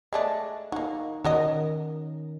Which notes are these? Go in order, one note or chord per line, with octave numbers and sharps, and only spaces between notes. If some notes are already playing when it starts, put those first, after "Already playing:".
G#3 A3 D4 D#5
A#3 D#4 F#4
D#3 C#4 F#4 A#4 D#5